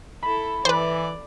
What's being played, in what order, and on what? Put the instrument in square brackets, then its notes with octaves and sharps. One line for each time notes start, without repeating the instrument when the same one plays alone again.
[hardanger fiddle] E4 A4 [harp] B5
[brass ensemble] E3 [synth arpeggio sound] B4 C5 [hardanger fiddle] D5